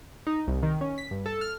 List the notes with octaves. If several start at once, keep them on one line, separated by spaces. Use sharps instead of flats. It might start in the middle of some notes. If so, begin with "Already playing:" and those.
D#4
C2
D#3
C#4
B6
G2
A4
F6